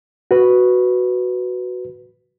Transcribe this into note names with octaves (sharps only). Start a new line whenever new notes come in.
F#4 B4